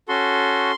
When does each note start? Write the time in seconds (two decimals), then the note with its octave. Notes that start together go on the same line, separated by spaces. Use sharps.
0.08 C#4 F#4 A4 C6